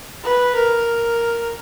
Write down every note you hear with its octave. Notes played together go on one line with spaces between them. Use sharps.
B4
A#4